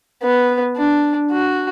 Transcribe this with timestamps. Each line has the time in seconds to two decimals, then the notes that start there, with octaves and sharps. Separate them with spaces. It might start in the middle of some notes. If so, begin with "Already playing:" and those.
0.23 B3
0.77 D4
1.32 F#4